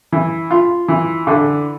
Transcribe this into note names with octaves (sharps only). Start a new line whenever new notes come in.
E3
F4
E3
D3